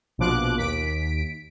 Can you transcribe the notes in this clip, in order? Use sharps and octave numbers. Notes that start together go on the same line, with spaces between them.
A#1 B2 F3 D6 F#6
D#2 B6 D7